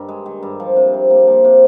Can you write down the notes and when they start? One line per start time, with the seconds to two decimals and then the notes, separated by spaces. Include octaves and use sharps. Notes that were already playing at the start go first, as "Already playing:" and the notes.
Already playing: G2 D#3
0.09 G#3
0.26 D#3
0.43 G2
0.60 F3
0.76 C3
0.94 C3
1.10 A#3
1.27 F3
1.45 C3